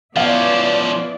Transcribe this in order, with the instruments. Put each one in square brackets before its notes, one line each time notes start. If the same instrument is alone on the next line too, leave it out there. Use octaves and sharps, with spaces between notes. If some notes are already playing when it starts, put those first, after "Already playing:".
[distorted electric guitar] F3 C#4 [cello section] B3 E4 D5 [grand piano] F5